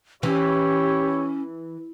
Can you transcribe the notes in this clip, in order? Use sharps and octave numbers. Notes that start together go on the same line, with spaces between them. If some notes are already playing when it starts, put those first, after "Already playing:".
E3 C#4 E4 G4 C#5